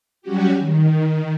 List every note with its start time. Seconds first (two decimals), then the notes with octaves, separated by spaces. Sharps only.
0.22 F#3 G3 C#4 F#4 G4
0.59 D#3